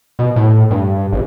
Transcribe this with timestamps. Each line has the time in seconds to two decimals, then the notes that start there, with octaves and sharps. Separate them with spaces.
0.19 B2
0.36 A2
0.71 G2
1.13 G#1